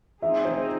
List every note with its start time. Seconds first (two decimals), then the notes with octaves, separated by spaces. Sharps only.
0.22 C4 D#4 G#4 E5
0.45 C5